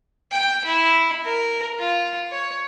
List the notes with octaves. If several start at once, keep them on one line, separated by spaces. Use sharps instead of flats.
G5
E4
A#4
F4
C#5